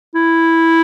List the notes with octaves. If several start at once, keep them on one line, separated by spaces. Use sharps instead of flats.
E4